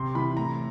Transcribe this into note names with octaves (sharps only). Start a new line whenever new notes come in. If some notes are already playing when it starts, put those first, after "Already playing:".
Already playing: C3 C6
E3 B5
A2 A#5